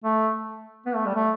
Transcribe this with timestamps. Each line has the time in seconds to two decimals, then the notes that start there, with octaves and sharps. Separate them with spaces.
0.04 A3
0.86 B3
0.95 A3
1.06 G3
1.15 A3